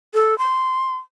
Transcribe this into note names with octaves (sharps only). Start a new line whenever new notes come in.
A4
C6